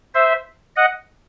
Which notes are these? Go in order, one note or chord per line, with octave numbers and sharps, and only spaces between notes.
C5 E5
D#5 F#5